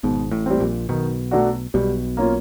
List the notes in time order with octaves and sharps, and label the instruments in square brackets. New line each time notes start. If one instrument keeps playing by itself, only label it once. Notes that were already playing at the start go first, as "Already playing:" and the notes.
[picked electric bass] G#1 G#2 [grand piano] B2
[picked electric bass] A1 A2
[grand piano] G3 C4
[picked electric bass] A#1 A#2
[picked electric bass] B1 B2 [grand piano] D#3
[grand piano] F#3 A3 D4 F#4
[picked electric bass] B1 B2 [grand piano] G3
[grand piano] A#3 C#4 F4